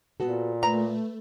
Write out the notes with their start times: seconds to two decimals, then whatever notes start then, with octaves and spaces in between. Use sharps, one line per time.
0.20 A#2 B3 F#4 A4
0.63 A3 B4 A#5